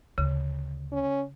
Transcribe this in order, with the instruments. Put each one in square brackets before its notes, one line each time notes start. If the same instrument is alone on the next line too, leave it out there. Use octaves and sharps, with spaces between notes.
[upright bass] D2 [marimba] C#3
[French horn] C#4